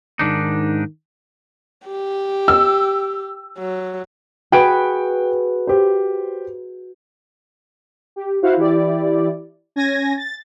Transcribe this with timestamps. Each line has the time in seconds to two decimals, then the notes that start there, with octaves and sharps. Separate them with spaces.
0.19 G#2 D#3 D4 D#4
1.86 G4
2.48 E6
3.58 F#3
4.52 F#4 G#4 B4 G5 D7
5.67 G4 C5
8.16 G4
8.42 E4 F#4 C5 F5 F#5
8.57 E3 E4 G4 D5
9.76 C#4 G#5 G#6 A#6
10.17 A6